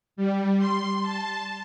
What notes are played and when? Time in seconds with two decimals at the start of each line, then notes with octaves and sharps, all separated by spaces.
0.16 G3
0.59 C6
1.02 A5